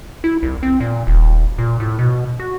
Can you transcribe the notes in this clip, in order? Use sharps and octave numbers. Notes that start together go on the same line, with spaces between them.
E4
C2
C4
A#2
D#1
A#2
A2
B2
F#4